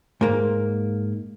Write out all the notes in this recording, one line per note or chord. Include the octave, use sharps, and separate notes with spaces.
G#2 A#3